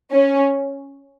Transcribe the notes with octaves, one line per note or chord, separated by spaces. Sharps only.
C#4